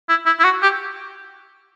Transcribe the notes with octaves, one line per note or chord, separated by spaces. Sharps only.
E4
E4
E4
F#4
G4